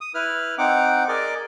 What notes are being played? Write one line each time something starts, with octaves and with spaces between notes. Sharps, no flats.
D#6
E4 B4 F6
C4 D#4 F#5 D6
G#4 A#4 D5 D#5 D6